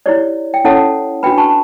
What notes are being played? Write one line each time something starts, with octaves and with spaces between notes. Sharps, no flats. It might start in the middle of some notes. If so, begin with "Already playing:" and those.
E4 G4 C#5 D5
G5
C#4 E4 A4 C#5 F#5 A5
D4 F#4 B4 G5 B5
A5 C#6